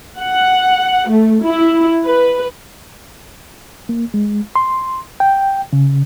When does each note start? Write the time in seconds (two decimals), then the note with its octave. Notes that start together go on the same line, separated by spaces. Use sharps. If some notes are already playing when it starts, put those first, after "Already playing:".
0.17 F#5
1.09 A3
1.43 E4
2.04 B4
3.89 A#3
4.14 G#3
4.56 C6
5.20 G5
5.73 C#3